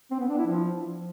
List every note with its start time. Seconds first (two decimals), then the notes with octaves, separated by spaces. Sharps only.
0.11 C4
0.20 B3
0.29 D4
0.38 E4
0.47 F3